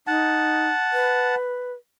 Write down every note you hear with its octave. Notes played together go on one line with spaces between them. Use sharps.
D#4 F#5 A5
B4